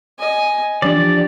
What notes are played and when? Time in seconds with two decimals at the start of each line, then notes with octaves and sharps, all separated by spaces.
0.18 D#5 G#5
0.82 E3 F3 D4 G4 D5